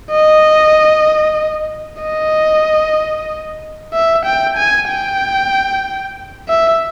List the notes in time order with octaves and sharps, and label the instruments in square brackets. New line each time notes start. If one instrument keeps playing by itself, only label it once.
[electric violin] D#5
D#5
E5
G5
G#5
G5
E5